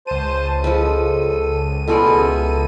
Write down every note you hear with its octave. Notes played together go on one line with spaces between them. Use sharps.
C#2 C5 A5 D#7
F3 G#3 A4 B4
B2 E3 G#3 F4 A4 D5
G#4 A#4 E5